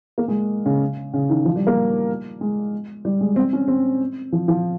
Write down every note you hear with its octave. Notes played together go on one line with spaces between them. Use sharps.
A#3
G#3
C#3
C#3
D#3
F3
G3
A#3
G#3
G3
G#3
C4
C#4
C4
F3
F3